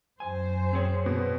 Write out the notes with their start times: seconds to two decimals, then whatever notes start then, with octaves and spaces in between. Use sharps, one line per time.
0.20 F#2 C5 G#5
0.73 C4 G#4 C#5
1.06 B2